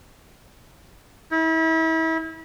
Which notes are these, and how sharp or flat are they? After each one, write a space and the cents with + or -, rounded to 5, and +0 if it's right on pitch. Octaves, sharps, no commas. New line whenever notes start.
E4 -35